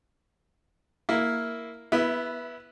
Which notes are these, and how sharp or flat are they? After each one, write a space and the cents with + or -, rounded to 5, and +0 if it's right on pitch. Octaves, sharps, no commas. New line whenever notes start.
A#3 +0 E4 +0
B3 -10 E4 +5 E5 -25